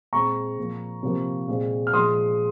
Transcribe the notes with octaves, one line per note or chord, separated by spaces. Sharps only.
A#2 G#3 C4 A#5 C#6
A#2 F3 A#3
C3 F3 A#3
A#2 G#3 C4
F6
A#2 F3 G#3 C6 D#6